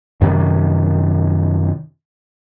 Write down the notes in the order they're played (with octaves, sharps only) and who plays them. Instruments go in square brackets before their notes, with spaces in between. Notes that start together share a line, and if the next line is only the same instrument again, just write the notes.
[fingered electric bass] F#2 C3 D#3